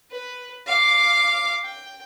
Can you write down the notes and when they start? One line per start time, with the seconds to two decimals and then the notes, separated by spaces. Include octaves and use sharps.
0.11 B4
0.67 F5 D6
1.64 G5